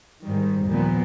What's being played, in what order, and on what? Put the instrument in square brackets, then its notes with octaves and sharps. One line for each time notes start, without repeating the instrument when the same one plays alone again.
[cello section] G#2 D#3 G3
D#2 A#2 F3 B3